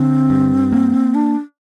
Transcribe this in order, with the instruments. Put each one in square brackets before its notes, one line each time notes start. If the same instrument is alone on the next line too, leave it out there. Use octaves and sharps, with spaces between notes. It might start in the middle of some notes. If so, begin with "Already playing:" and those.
Already playing: [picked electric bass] D3 [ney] C4
[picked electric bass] G2
A#3
[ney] D4